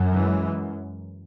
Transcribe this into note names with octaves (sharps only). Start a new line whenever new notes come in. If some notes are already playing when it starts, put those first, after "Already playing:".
Already playing: F#2
E3 G#3